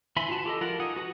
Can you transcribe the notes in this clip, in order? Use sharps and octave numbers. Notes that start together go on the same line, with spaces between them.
E3 E5 G#5 B5 C6
F4 F#4 A5
G4 A4 D#5
F3 F4 A#4 F#5
D#4 F#5 G#5 D#6
F#4 B4 F#5